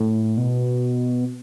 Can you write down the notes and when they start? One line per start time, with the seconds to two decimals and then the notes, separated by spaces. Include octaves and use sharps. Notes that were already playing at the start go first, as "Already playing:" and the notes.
Already playing: A2
0.37 B2